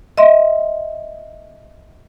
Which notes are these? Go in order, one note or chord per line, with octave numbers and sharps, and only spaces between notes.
D#5 E5 C6